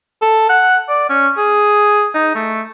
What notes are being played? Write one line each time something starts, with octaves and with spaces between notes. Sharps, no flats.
A4
F#5
D5
C#4
G#4
D#4
A3